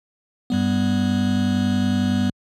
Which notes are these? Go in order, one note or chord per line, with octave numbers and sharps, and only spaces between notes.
G2 G3 B3